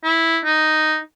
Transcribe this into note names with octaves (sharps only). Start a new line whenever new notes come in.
E4
D#4